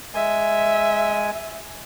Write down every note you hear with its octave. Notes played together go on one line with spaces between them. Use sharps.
G#3 E5 G#5